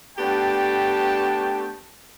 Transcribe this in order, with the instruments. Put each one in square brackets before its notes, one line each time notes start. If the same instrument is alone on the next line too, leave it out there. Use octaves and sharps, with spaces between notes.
[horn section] A3 B3 D4 G4 G5 A5